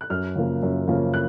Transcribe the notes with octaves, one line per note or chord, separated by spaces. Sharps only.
F#6
F#2 F6
C#3 F3 A#3
F#2
C#3 F3 A#3
F#6